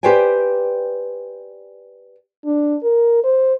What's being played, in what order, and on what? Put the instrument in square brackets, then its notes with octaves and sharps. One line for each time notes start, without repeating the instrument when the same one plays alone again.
[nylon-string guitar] G4 B4 C5 D5 G5 G#5
[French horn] D4
A#4
C5